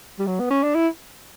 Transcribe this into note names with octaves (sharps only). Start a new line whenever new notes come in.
G3
F#3
B3
C#4
D4
E4